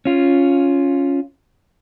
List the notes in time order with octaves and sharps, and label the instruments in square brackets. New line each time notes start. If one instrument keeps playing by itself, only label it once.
[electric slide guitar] C#4 F4